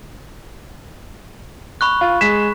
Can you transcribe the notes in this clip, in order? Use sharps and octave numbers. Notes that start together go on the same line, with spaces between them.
B5 C#6 F#6
F4
G#3 B6 E7